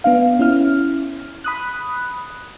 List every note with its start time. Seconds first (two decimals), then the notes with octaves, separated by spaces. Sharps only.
0.04 B3 D4 F5
0.39 C#4 E4 F6
1.44 B5 D#6 F#6